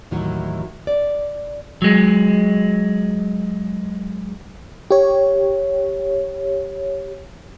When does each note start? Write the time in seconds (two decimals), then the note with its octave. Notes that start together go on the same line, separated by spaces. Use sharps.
0.11 D#2 A2 D#3 E3 F#3 F#4
0.87 D5
1.82 F#3 G#3
4.90 G4 C#5